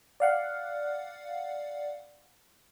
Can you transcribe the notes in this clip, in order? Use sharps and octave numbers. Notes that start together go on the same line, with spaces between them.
D5 F5 F#5